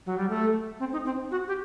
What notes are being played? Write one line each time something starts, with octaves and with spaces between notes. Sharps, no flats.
F#3
G3
A3
C4
D#4
C4
F#4
G4